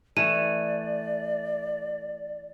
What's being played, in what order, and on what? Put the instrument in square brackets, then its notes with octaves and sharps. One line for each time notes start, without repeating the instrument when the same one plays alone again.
[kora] E3 A3 [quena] D5 [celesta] D#7